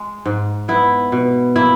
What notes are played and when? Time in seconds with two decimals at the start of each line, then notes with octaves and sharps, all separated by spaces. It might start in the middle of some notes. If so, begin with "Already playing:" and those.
Already playing: G#3
0.26 G#2
0.68 B3 E4
1.12 B2
1.56 A#3 E4